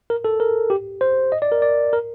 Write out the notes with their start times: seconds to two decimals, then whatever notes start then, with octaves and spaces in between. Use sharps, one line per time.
0.10 A#4
0.25 A4
0.40 A#4
0.70 G4
1.01 C5
1.32 D#5
1.42 D5
1.52 A#4
1.62 D5
1.93 A#4